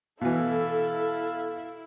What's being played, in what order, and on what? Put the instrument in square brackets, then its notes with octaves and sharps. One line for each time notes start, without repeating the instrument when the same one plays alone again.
[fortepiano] B2 E3 [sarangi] E4 [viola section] A4 [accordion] F5